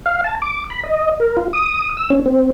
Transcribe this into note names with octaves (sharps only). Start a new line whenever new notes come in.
F5
A5
D6
B5
D#5
A#4
F4
D#6
E6
C#4
C4